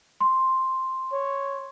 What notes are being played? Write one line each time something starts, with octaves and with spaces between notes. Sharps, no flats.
C6
C#5